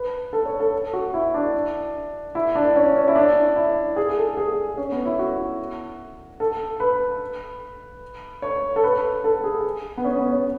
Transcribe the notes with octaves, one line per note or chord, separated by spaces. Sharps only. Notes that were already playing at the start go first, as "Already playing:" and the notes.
Already playing: B4
A4
C#5
A4
F#4
E4
D4
E4
D4
C#4
C#4
E4
D4
E4
G#4
A4
G#4
C#4
B3
E4
F#4
A4
B4
C#5
A4
B4
A4
G#4
B3
C#4
B3
C#4